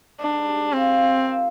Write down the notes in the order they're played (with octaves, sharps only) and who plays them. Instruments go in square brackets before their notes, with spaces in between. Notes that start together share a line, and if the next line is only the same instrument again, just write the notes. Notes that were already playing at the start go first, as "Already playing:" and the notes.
[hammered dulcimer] G#2 [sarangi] D4
[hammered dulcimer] G3
G3
[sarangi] C4 [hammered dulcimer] F4
[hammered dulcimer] F4
D#3
F3